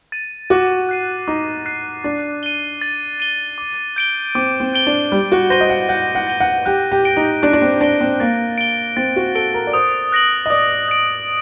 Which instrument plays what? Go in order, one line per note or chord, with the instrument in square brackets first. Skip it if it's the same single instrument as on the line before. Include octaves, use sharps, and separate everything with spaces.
[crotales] A6 D#7
[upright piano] F#4 [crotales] D6
[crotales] F#6 C7 D#7
[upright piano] D#4 [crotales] D6
[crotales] F#6 C7 D#7
[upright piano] D4 [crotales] A6
[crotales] D#7 G7
A6
D#7 G7
D6
G6 D7 G7
[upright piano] C4 [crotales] D6
[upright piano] C4
[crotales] G6 D7 G7
[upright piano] D4
[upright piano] G3 [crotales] G6
[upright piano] F#4
[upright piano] C5 [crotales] A#6 D#7 G7
[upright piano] D#5
F#5
[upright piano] F#5 [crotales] G6
[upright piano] F#5
[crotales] A#6 D#7 G7
[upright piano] F#5
[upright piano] G4 [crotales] F#6
[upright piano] G4
[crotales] A#6 D7 G7
[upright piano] D#4
[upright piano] D4 [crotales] F#6
[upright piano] D4
C4
[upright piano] D4 [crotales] A#6 D7 G7
[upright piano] C4
[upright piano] A#3 [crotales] A6
[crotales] D7 G7
[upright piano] C4 [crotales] A6
[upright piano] F#4
[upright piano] A4 [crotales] D7 G7
[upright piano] A#4
D5
[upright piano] C5 [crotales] D#6
[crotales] F#6 A#6 D7 F#7
[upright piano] D#5
[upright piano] D5 [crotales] D#6
[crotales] F#6 A#6 D7 F#7